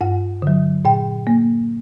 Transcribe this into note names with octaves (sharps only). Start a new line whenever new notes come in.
G2 F#5
D3 F#3
A#2 G5
A#3